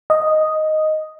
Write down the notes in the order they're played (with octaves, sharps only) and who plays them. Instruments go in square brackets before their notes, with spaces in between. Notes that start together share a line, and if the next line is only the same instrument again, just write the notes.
[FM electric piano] D#5